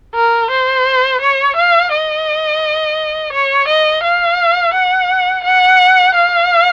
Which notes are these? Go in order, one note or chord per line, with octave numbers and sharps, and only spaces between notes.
A#4
C5
C#5
F5
D#5
C#5
D#5
F5
F#5
F#5
F5